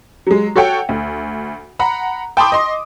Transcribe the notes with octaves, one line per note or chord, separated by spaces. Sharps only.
F#3 G#3
F#4 A4 C#5 F#5 G5
D2
F#5 A#5 B5
G5 A5 B5 C6 D6 D#6
D#5 C6